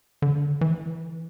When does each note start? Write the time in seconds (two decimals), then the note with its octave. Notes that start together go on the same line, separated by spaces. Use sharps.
0.22 D3
0.61 E3